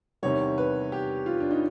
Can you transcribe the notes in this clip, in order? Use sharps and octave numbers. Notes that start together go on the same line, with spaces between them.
E2 C3 D#3 G3 C#5
B4
G4
F4
D4
D#4